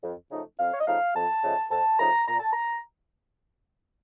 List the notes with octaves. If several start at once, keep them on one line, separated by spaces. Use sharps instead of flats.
F2
C#3 F3 A3 D#4
F2 F5
C#5
D#5
C#3 F3 A3 D#4 F5
F2 A5
C#3 F3 A3 D#4
F2 A5
C#3 F3 A3 D#4 A#5
A#2 A#5
A5
A#5